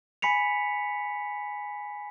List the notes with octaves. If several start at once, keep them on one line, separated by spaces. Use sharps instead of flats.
G#5 B5 B6 C#7 F7